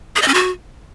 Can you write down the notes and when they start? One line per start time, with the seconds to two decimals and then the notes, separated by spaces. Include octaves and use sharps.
0.16 G#4
0.22 D#5
0.28 C#4
0.34 F#4